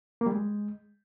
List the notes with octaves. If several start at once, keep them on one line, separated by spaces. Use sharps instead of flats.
A#3
G3
G#3